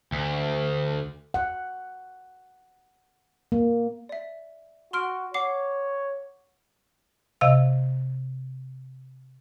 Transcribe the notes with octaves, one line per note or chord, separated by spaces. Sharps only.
D2
F#5
A#3
D5 E5
F#4 C6 F6 D7
C#5 F#5 D6 C7
C3 D#5 F5 E6